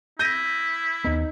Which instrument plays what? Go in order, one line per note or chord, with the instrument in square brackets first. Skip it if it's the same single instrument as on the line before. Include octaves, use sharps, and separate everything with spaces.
[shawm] E4 [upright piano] G6 A#6 D#7
[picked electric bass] D#2 B3 [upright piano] D#4